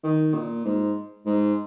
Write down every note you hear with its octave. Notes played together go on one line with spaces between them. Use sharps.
D#3
A#2
G#2
G#2